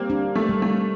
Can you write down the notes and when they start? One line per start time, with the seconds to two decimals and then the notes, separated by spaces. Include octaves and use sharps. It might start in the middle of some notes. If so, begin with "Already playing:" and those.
Already playing: G3 A#3 C4 G4
0.10 D4
0.35 A3
0.49 G3
0.62 A3